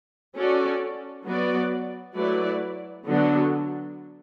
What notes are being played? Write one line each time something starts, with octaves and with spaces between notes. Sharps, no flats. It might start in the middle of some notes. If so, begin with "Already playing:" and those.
C#4 F#4 A4 D5
F#3 B3 F#4 B4 D5
F#3 A3 E4 B4 D5
D3 F#3 B3 D4 F#4